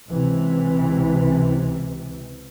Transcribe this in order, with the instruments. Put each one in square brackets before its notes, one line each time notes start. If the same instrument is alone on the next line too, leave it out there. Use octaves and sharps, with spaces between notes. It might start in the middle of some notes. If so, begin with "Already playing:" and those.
[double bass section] C#2 C3 E3